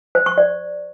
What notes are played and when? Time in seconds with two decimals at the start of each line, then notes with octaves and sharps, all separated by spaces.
0.15 C5
0.26 C#6
0.38 D5